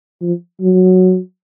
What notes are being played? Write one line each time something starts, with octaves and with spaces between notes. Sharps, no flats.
F3
F#3